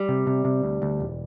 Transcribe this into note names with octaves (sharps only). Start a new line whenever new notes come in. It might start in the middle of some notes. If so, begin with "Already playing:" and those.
Already playing: G3
C3
C3
C3
D2
D2
E1